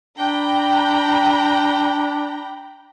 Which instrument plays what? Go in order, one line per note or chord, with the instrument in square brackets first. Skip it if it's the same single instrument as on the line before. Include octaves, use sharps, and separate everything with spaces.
[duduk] D4 [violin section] G5 A#5 B5